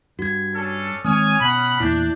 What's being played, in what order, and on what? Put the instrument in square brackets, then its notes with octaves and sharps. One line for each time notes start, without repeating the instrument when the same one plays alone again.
[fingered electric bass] G2 [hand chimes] F#4 G#6
[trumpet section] C#4 D4 A4
[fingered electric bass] D#3 G#3 C4 [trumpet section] C#5 G#5 [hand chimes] D#6 F6
[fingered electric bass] B2 [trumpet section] C#4 F#5 B5
[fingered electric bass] E2 A#2 [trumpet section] D4 [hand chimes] E4 G6